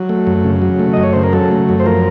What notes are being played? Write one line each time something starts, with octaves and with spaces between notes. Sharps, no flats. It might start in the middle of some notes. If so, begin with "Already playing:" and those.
Already playing: F#3
A3
F#2
C#3
F#3
A3
F#2 D#5
C#5
C#3 C5
A#4
F#3 A4
A3
F#2
C5
F3 A#4